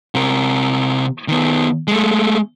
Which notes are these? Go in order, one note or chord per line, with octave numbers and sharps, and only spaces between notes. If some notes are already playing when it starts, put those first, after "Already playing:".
C3 A#4
D#3 B3
G#3 A3